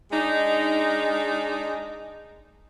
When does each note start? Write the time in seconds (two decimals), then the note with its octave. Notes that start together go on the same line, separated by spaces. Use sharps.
0.12 G#3 D4 D#4